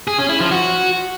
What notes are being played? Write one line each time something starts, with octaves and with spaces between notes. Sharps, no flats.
G#4
C#4
E4
F3
F#4